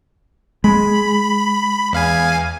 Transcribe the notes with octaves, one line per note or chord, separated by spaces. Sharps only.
G#3 B5
E2 F5 G#5